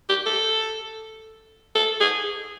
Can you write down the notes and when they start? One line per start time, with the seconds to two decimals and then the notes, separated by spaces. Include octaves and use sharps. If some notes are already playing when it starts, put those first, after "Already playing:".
0.09 G4
0.26 A4
1.75 A4
2.00 G#4